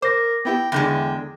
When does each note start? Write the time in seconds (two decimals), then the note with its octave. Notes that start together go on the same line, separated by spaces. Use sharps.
0.02 A#4 C5 D6 A#6
0.45 B3 E4 G4 G5
0.72 E2 D3 G#3 G5